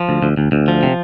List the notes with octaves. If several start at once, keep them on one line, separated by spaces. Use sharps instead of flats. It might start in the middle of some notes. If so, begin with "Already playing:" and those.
Already playing: F3
D2
D2
D2
D2
F3
C3